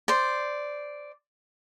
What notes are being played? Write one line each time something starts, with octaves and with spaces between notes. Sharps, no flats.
C5 D5